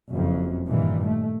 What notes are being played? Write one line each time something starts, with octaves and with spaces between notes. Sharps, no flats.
F#1 F2
G2 A#2 D#3 E3
A3